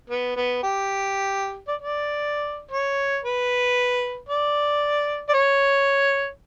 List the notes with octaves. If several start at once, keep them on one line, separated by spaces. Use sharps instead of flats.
B3
B3
G4
D5
D5
C#5
B4
D5
D5
C#5